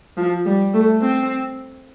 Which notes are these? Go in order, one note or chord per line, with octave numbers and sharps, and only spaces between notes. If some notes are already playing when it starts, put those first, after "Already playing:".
F3
G3
A3
C4